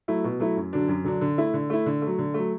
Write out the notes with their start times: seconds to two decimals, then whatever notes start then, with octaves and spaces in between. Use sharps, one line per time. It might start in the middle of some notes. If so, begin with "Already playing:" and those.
0.08 F#3 A3 E4
0.24 B2
0.40 F#3 A3 E4
0.57 F#2
0.73 D3 F#3 D4
0.88 F#2
1.04 D3 F#3 D4
1.21 D3
1.38 A3 E4
1.54 D3
1.70 A3 E4
1.86 D3
2.02 A3
2.07 F#3
2.19 D3
2.34 F#3 A3